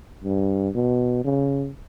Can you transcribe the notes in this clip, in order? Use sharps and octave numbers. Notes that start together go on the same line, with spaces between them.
G2
B2
C#3